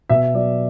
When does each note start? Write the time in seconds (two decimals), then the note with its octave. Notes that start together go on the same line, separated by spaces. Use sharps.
0.10 B2 E5
0.34 F#3 B3 D5